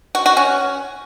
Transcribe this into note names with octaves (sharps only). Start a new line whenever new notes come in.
F#4
F#4
C#4